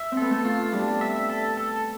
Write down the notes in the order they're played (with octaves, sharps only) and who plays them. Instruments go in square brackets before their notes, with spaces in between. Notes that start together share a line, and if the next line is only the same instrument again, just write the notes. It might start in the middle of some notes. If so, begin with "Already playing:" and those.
Already playing: [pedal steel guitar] E5
[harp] C4
[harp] B3 [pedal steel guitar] A4
[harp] A3
[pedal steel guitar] F4
[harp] G3 [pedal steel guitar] D4
[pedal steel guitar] E5
A4
A4